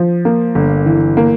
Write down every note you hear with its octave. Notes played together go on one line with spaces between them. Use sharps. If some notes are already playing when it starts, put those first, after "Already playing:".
Already playing: F3
A#3
G1
E3
A#3